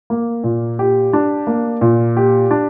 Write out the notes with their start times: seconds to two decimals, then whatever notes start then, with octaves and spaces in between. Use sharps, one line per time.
0.10 A#3
0.44 A#2
0.79 G4
1.13 D4
1.47 A#3
1.81 A#2
2.17 G4
2.51 D4